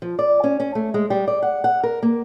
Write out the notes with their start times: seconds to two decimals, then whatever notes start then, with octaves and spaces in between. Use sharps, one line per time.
0.02 F3
0.19 D5
0.44 C#4
0.60 C#4
0.75 A3
0.94 G#3
1.10 G3
1.28 D5
1.42 F#5
1.64 F#5
1.84 A#4
2.03 A#3